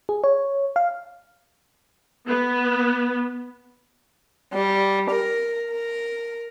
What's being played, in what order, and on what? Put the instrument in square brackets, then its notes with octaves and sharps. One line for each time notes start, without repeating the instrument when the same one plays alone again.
[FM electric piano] G#4
C#5
F5
[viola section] B3
[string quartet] G3
A#4
A#4